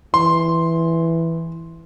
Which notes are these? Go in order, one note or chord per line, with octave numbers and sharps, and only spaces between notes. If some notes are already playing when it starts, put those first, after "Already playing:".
E3 C6